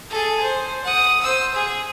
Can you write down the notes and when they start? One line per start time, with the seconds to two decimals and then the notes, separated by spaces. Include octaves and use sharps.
0.10 G#4 A4
0.42 C5
0.84 F#5 D#6
1.23 C5 E6
1.54 G#4